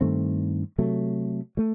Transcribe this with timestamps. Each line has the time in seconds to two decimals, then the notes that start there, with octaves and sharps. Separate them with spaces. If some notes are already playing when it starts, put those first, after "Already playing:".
0.01 G2 D#3 A3 C4
0.78 C3 F#3 A3
1.57 F#3 A3